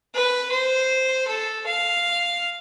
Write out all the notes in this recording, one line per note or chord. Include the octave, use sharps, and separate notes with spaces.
B4
C5
A4
F5